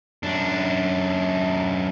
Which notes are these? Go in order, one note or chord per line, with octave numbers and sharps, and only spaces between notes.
F#2 D4